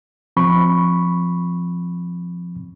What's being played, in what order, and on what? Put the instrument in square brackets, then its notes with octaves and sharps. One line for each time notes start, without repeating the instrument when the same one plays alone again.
[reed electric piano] F3 C4 B5 C#6